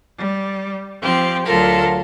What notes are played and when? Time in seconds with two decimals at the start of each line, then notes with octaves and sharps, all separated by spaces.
0.17 G3
1.02 F3 C4 G4
1.45 D2 F#3 F4 A4 A#4